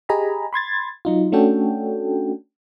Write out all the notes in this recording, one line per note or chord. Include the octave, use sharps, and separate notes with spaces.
G4 G#4 D#5 G#5 A#5 B5
B5 C6 G#6 A6
F#3 D#4 F4
A3 C#4 D4 F#4 A4 G5